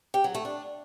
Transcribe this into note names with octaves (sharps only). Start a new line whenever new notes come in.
G4
F#3
A3
D4